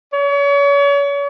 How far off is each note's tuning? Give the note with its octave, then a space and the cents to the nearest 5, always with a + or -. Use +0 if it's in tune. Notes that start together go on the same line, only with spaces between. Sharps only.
C#5 +35